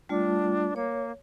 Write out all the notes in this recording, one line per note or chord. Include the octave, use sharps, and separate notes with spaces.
G3 A3 D4 F4
A#3 C#5